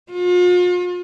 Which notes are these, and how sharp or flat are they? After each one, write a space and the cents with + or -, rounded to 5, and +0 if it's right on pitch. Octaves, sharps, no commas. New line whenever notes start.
F4 +40